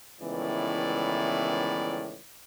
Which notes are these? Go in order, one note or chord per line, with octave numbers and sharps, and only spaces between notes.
C#2 A2 D#3 E3 B3 D5